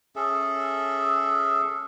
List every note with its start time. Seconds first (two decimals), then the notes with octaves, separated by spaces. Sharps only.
0.16 C#4 G#4 A4 E5